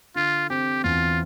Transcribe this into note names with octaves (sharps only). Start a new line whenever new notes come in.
D3 F4
C4 G4
E2 F4